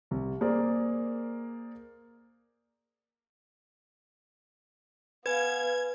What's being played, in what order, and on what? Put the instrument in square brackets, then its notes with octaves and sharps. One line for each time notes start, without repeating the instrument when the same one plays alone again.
[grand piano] C2
A#3 G#4 A#4 C5 D5
[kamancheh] B3 F5 [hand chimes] B4 G#5 [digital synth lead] G#6